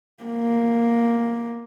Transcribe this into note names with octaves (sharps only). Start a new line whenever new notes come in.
A#3